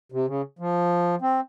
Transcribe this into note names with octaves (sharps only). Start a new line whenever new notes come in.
C3
C#3
F3
C4